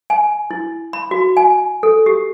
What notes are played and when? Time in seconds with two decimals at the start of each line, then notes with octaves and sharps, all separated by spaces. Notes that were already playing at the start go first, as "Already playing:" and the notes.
0.10 G#5
0.51 E4
0.93 B5
1.11 F#4
1.37 G#5
1.83 A4
2.06 G4